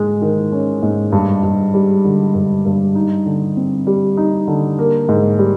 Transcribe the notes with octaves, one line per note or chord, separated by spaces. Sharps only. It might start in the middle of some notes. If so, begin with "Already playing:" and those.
Already playing: G#2 G#3
D#3
C#4
G#2
G2
G2
G3
D3
G2
G2
D#4
D3
C4
G3
D#4
D3
A#3
G#2
G3